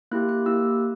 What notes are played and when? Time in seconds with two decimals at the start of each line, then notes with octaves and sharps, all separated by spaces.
0.11 A#3 E4 G4 F#6
0.29 F#6
0.46 A#3 E4 G4 E6